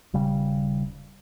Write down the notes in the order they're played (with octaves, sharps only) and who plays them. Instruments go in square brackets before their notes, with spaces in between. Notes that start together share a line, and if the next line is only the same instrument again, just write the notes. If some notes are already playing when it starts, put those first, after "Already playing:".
[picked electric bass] D#1 C#3 G3